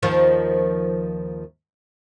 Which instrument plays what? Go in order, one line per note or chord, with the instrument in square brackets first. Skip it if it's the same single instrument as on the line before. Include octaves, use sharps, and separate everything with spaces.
[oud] D#2 D#3 F3